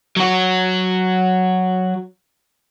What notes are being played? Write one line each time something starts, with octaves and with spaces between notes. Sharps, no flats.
F#3 F#4